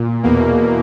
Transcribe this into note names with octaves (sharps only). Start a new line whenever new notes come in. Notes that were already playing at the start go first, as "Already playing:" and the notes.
Already playing: A#2
E2 B2 A#3